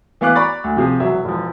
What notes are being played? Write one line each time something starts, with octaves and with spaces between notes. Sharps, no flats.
E3 B3 F5 D6 F#6
D5 A#5 B5 C#6 D6 A6
D2
C3 F3 G#4
E1 F#3 E5
E1 F3